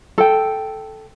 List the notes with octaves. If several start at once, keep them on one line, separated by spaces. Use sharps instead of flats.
A4 G5